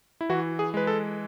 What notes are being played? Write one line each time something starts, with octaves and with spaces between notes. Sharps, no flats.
E4
E3 F#4
G#4
G#3 B4
A4